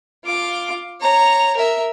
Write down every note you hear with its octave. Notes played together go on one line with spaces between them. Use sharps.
F4 D6
C#5 A#5
A#4 E5